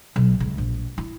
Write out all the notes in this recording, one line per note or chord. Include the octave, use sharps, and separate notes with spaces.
B1
C#2
A#1
E4